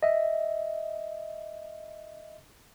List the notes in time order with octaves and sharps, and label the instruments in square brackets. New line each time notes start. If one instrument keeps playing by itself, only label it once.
[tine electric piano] D#5 E5